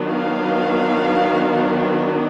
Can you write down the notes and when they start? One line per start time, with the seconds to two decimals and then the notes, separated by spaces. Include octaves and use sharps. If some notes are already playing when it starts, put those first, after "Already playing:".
Already playing: D#3 F#3 B3 D4
0.10 F5